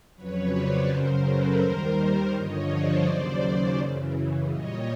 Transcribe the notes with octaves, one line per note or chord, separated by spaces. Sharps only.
F2 C#3 F#3 B4 C#5
C5 D5
F#2 C#3 F#3 A#4 C5
A4 B4
D#2 D#3 G3 A#4 C5
G2 D3 F3 C#5 D#5
C5 D5
D#2 C#3 F#3
F#2 C#3 E3
A#2 G3 C#5 D#5